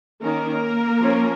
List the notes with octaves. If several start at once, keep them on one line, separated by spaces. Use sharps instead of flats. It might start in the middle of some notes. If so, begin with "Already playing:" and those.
D#3 A#3 C#4 A#4
F3 C#4